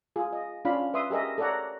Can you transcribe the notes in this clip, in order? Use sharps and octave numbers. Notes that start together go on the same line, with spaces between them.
F4 G#4
D#5
C#4 D4 F4 D5 F5 B5
B4 E5 C6 D#6
G4 G#4 A#4 D#5 E5
A4 A#4 C#5 D5 F#5 A#5